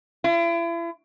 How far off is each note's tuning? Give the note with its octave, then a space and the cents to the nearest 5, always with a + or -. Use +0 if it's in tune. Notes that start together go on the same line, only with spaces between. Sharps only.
E4 +40